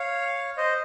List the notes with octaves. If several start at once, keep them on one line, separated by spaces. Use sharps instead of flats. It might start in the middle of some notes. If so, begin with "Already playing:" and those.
Already playing: C#5 F5
C5 D#5